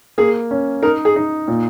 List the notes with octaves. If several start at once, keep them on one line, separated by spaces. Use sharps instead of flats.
A#3 G#4
C#4
D#4 A#4
G#4
D#4
A#2